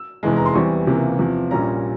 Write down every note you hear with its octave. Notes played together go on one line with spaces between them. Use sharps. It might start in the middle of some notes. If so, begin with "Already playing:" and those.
Already playing: E6
F1 E2 E3 G#3
A#5
C6
E2 E3 G3 C4 C#6
C#2 C3 E3 A#3
E2 C3 F3
A#1 A#2 G3 C#4 A#5